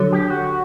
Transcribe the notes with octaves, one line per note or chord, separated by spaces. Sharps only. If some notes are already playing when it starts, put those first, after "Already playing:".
Already playing: D3 F#3
G4
F#4